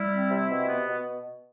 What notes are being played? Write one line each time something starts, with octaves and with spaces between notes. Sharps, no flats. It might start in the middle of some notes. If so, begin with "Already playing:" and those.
Already playing: G3 E4
C4
C3
B2
B3
B2